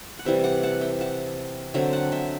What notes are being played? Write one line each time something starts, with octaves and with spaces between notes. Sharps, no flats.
F#5
C3 E3 G3 E5 G5
D5 F#5
F#5 A5
E5 G5
F#5 A5
D3 F#3 C4 E5 G5
F#5 A5
E5 G5